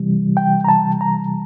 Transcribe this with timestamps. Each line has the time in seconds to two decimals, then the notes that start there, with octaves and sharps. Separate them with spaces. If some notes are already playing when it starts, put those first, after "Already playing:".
Already playing: C3 E3 G3
0.37 G5
0.64 A#5
0.68 A5
1.01 A#5